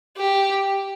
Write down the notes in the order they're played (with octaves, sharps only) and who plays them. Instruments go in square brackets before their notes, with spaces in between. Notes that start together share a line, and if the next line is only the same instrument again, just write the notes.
[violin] G4